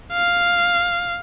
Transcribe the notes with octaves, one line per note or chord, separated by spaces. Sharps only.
F5